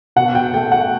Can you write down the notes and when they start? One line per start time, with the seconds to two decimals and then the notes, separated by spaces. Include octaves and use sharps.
0.16 B2 F#5
0.35 G5
0.53 A3 G5
0.72 F#5